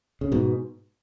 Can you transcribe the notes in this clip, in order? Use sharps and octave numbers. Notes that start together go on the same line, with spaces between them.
C#3
G#2 B2